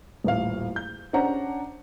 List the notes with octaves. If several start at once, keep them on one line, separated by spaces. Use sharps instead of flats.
D#1 A1 F5
G6
C#4 D4 C5 F#5 A#5